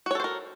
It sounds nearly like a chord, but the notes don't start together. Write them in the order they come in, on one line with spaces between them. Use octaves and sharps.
F#4 C#5 A4 C5 A#4